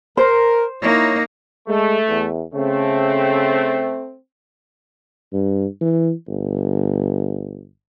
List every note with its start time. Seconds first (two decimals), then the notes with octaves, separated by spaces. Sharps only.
0.17 A#4 C5
0.82 A#3 D#4 E4 C#5
1.68 G#3 A3
2.08 E2
2.54 C#3 A3 C4
5.33 G2
5.81 E3
6.27 G1